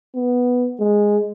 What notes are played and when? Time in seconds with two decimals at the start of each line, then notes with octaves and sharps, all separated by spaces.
0.15 B3
0.80 G#3